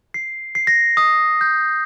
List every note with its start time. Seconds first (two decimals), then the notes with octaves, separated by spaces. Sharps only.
0.14 C7
0.55 C7
0.67 A#6
0.97 D#6
1.41 G6